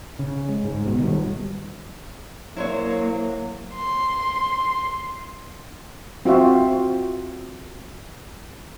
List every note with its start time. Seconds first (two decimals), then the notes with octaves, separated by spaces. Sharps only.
0.19 C#3
0.49 G#3
0.64 G#2
0.85 G1 B2
1.00 D#3 G3
2.57 F#3 A#3 E4 C5 C#5
3.75 C6
6.25 C4 F4 F#4 E5